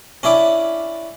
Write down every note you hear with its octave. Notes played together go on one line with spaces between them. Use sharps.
C#4 D4 E4 D6